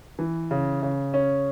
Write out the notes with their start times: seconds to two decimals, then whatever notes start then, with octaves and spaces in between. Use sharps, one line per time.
0.19 E3
0.51 C#3
0.83 C#3
1.14 C#4